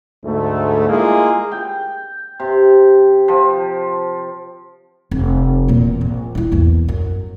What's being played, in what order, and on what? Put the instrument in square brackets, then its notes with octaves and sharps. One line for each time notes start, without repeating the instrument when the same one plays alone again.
[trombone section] D2 G#2 A3
G#3 A#3 E4 F4 G#4
[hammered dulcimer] G5
C3
F3
[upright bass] F1
E2 A#2
A#1
D4 E4
A#1 E2
F#2